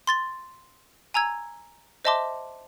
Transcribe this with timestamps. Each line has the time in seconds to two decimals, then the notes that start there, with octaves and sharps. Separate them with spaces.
0.07 C6 A6 G7
1.14 G#5 A#5 E6 G#6
2.05 C5 D#5 E5 A5 C6 D6